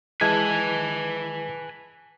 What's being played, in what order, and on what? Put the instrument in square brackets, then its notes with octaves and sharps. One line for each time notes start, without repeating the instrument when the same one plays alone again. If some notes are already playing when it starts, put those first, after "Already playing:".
[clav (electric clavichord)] E3 G#3 [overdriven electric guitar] B4 G#5 [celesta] A5 G#6